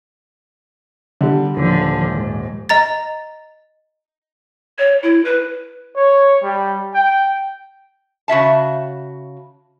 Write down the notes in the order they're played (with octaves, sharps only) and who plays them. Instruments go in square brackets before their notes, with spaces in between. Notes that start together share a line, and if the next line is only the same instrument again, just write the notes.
[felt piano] D3 G3
[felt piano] D#1 [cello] D3 F3
[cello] G#2
[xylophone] D#5 A#5 A6
[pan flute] C#5
E4
B4
[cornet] C#5
G3
G5
[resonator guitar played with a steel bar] C#3 F#4 E5 A5